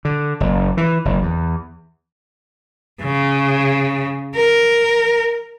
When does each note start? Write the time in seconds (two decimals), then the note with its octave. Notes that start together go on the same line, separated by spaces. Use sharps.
0.05 D3
0.40 F#1
0.77 E3
1.05 F#1
1.22 E2
3.02 C#3
4.36 A#4